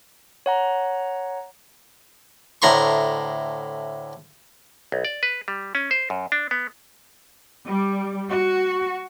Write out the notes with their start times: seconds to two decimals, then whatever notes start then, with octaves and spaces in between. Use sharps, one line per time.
0.46 C#5 F#5 A#5
2.62 D2 A2 A#5 C6 C#6
4.92 B1
5.05 D5
5.23 B4
5.48 G3
5.75 C#4
5.91 C5
6.10 F#2
6.32 D4
6.51 B3
7.67 G3
8.31 F#4